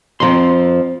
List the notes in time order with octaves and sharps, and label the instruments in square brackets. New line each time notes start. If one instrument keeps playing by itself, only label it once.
[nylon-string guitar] F2 F3 [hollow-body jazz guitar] C4 A#5 C6